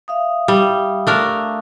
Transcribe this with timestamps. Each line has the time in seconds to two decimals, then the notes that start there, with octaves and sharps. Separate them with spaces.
0.08 E5 F5 D#6
0.48 G3
1.07 A3 D4 A#4